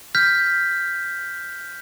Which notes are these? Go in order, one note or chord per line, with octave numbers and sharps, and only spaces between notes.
F6 G6 B6